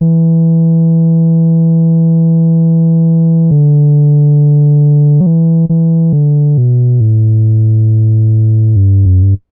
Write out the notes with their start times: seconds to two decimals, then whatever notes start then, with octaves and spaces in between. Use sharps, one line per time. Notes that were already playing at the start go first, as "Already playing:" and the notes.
0.01 E3
3.51 D3
5.21 F#3
5.26 E3
5.69 E3
6.13 D3
6.58 B2
7.01 A2
8.76 G2
9.05 F#2
9.23 G2